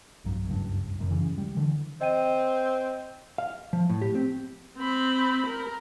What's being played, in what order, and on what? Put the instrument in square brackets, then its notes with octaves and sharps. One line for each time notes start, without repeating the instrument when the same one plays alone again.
[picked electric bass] B1 G2 F#3
F#1 C#2 G2
E1 F#2 C#3
D1 G1 C#3 E3
G3
D3 E3
[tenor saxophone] C4 [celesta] D#5 G5 D#7
[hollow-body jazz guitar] F5
F3
A2
G4
C4
[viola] C4 B5
A#4